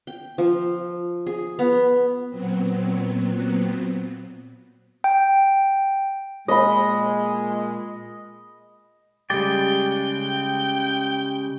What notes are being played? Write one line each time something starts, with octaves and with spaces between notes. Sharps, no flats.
G5
F3
G#4
B3
A#2 F#3 B3 C4
G5
A#2 G#3 D#5 B5
C#3 G3 G#3 G4 D5 G5